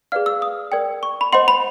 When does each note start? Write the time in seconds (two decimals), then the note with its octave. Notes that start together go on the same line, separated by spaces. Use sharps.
0.12 G#4 B4 D5 F5 F6
0.26 E6
0.42 D#6
0.72 A#4 D5 G5
1.03 C#6
1.21 B5
1.33 C5 D#5 F#5 C6
1.48 B5